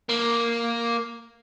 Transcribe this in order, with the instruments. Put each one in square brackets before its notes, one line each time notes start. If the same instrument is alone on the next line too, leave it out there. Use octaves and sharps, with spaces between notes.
[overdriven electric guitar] A#3